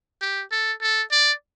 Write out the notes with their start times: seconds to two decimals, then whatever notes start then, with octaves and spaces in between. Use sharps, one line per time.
0.21 G4
0.52 A4
0.81 A4
1.11 D5